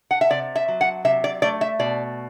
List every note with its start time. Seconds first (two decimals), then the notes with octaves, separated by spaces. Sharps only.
0.11 F#5
0.21 E5
0.30 C3 D5
0.56 E5
0.68 F#3
0.81 F#5
1.05 C3 E5
1.24 D5
1.42 A3 D5
1.61 E5
1.79 B2 D5